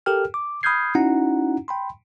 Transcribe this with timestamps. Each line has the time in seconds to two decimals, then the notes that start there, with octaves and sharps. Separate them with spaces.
0.06 G4 A4 A#4 G5 F6
0.34 D6
0.63 B5 D#6 F6 G6 G#6 C7
0.95 C#4 D#4 E4 F#4 F#5 A#5
1.68 G5 B5 C6